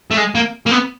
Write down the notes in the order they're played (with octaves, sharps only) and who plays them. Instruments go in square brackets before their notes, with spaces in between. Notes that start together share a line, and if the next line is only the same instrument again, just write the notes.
[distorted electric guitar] A3
G#3
A#3
A#3
B3